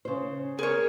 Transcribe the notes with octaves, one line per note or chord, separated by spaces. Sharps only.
C#3 C5
G#4 A#4 C#5